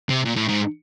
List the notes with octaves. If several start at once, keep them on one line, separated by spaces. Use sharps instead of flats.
C3
A#2
A2
G#2